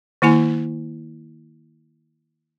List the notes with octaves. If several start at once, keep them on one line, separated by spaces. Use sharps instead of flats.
D#3 A#3 E4 G#5